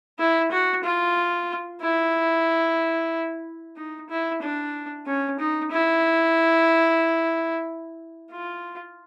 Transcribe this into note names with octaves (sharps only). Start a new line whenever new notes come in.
E4
F#4
F4
E4
D#4
E4
D4
C#4
D#4
E4
F4